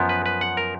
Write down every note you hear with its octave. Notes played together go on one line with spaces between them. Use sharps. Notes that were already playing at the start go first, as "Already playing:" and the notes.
Already playing: F#2 F3 B3
B4
B4
F#5
A#4